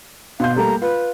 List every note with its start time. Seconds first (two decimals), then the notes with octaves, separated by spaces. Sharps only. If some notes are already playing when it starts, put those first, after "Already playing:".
0.40 B2 F5 C6 G6
0.56 G3 A3 A#3 A#5
0.82 F4 B4